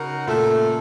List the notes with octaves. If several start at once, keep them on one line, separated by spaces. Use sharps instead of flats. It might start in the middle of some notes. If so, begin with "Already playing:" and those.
Already playing: C#3 D#4 F#4 A#4
A#2 A3